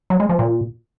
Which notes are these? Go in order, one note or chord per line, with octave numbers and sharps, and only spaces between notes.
F#3
G#3
F3
A#2